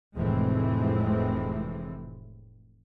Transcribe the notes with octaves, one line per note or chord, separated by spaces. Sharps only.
F1 A2 E3 G#3 C4